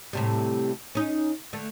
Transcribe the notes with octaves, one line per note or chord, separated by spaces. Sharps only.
A2 C3 G3
C#4 D#4
D3 A3